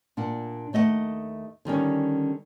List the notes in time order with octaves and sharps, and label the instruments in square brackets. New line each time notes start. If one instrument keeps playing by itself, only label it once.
[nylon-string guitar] A#2 D4 F#5
D#2 A3 D#5 E5 F#5
D3 D#3 G3 C#4